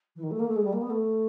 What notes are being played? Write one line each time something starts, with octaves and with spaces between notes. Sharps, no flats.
E3
D#3
A3
A#3
A3
G#3
G3
A#3
B3
A3